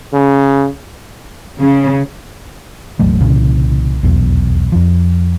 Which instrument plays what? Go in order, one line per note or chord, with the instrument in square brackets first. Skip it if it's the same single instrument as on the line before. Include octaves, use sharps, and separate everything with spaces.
[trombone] C#3
[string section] C#3
[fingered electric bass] E1 A1 F#3 A3
C2 A#2 C#3 E3
D#1 B1 E2
F2 F3